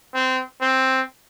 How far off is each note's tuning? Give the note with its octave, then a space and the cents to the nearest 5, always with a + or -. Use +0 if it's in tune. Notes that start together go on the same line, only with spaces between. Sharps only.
C4 -20
C4 +5